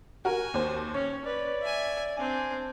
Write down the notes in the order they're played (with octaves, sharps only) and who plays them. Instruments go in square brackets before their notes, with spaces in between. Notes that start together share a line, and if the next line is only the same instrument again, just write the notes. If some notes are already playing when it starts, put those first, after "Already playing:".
[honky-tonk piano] F#4 A#4 [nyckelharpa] G#5
[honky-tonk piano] D#2 C5
[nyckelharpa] C#4 [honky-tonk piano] C#5
[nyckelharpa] B4 [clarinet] D5
[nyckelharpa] E5 G#5
[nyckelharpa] C4 D4 [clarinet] G#5